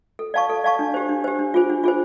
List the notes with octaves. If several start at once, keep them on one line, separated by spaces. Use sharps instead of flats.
A4
D5 F5 A5 C#6
A4
D5 F5 A5 C#6
D4
G4 C5
D4
G4 C5
D4
F4 G#4 C5
D4
F4 G#4 C5